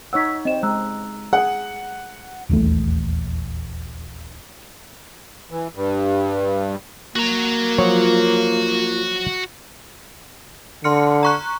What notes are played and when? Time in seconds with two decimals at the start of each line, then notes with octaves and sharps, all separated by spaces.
0.13 D#4 C#5 F#5 E6 B6
0.45 C4 D#5 E7
0.63 G#3 A#5 E6 F#6
1.33 G#4 F#5
2.50 D#1 A#1 E2 A3
5.51 E3
5.75 G2
7.16 A#3 F#4 A#5
7.78 F3 F#3 F4 C#5
10.84 D3 C6 F6 C#7
11.23 A#5 C#6 F#6